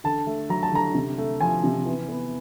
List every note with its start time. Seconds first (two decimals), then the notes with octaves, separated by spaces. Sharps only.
0.04 D3 A5
0.27 A3
0.50 F#3 A#5
0.63 A5
0.72 D3 A#5
0.95 C3
1.18 A3
1.41 F3 G#5
1.64 C3
1.85 E3
2.09 B3